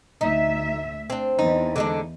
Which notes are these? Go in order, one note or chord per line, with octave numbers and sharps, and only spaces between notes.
D2 D#4 E5
C4 D4
E2 E3 D#4
D3 G#3 D4